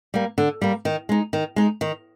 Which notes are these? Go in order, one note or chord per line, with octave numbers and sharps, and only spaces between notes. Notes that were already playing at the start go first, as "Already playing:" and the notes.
G3 A#3
D3
G3 A#3
D#3
G#3 D#4
D#3
G#3 D#4
D#3